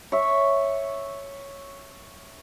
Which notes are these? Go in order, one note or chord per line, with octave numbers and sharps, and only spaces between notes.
C#5 E5